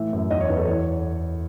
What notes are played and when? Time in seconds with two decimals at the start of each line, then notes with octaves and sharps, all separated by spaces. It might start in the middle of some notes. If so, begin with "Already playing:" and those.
Already playing: A2 E3 E5
0.13 F#2
0.30 E2 D#5
0.41 C#5
0.49 E2 B4
0.58 A4
0.67 E3 C#5